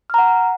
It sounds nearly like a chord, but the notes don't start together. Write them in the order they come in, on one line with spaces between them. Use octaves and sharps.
F6 A#5 F#5